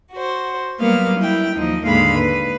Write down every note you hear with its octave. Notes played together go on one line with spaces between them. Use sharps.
F#4 C5
F#3 G3 A#3 B3 F5
E4 G5
D#2 F3 D#4
D#2 G#2 D3 G#3 F5 B5
B4